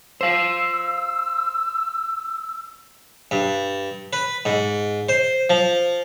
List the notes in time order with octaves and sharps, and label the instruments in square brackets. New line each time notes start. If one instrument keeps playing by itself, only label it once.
[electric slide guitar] C5 F5 [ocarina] E6
[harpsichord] G2
B4
G#2
C5
F3